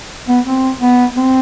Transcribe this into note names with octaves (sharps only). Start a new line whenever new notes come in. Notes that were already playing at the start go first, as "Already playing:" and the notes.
B3
C4
B3
C4